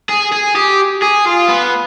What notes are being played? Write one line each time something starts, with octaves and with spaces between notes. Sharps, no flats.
G#4
G#4
G4
G#4
F4
B3